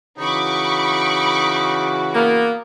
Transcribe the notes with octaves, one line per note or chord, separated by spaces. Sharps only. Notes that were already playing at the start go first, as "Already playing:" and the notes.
C#3 E3 D#4 F#4 B5 C#6 D6
A#3 B3